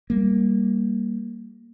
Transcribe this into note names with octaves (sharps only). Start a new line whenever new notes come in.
G3 A#3